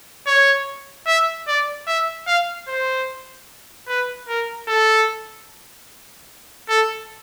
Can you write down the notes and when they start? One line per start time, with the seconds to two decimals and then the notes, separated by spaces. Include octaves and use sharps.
0.27 C#5
1.07 E5
1.47 D5
1.87 E5
2.27 F5
2.68 C5
3.88 B4
4.28 A#4
4.68 A4
6.69 A4